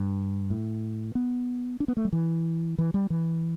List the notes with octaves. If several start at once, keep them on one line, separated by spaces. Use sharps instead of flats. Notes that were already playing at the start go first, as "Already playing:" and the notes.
Already playing: G2
A2
B3
D4
B3
A3
G3
E3
E3
G3
E3